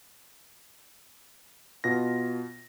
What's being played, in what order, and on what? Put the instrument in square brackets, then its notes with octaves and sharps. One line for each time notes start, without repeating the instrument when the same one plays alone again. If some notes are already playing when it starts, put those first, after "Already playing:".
[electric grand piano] B2 F4 A#6